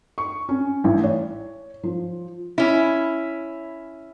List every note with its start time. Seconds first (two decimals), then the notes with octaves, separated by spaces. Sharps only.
0.18 C#6
0.49 C#4
0.84 A1
1.04 C#5
1.83 F3
2.58 C#4 E4